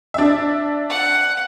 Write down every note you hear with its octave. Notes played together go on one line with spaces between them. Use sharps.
D4 E5
F#5